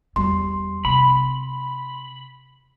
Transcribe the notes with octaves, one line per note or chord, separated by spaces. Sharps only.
E2 G3 C6
C3 B5